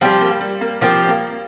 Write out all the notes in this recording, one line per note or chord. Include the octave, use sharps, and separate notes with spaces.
F3 G3 C4 G4
A#3
G3
A#3
F3 A#3 C4 G4
A#3